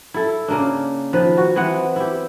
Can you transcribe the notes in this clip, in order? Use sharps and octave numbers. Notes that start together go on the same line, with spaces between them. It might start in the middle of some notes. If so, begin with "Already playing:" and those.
E4 A4
C#3 A#3 D4
D#3 F3 B4
F#4
E3 B3 C4 F#5
E4 G4